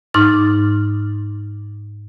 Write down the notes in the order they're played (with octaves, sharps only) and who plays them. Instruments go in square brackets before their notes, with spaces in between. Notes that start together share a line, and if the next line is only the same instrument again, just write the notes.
[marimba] G#2 D#4 D6 F6 A6